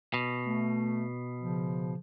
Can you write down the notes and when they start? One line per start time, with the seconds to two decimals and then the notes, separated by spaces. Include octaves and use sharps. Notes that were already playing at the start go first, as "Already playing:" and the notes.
0.14 B2
0.46 A3
1.41 C#3 F3